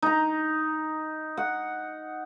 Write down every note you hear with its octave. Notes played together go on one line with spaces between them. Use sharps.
D#4 A#5
F#5